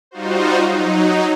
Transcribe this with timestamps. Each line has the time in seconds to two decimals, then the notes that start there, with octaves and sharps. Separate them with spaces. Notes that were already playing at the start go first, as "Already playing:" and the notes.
0.11 G3 D#4 F4 F#4 C5
0.62 F#3 D#4